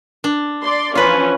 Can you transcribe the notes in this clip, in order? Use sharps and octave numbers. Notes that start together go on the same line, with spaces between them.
D4
D5 C6
E3 F3 C#4 F4 B4